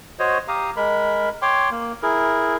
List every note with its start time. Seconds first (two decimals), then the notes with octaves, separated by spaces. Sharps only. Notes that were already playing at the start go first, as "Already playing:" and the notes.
0.19 F#4 C5 C#5 D#5
0.48 G4 F5 A#5 D#6
0.77 G#3 A#4 B5
1.42 C#5 G5 C6 D6
1.71 A#3
2.03 E4 G#4 A#4